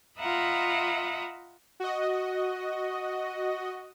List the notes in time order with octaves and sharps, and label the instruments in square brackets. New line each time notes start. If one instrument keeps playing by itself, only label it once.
[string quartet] F4 D#5 E5 F#5 A#5 B5
[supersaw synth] F#4 D#5